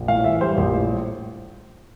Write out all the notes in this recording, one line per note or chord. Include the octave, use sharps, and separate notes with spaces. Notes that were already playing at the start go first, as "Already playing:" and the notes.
Already playing: A#1
A2 F5
E3 E5
G3 C5
A#1 C5
A2